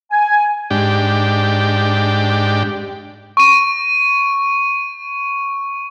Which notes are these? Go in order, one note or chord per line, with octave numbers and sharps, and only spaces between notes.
G#5
G#2 D4 G4 G5
C#6 D#7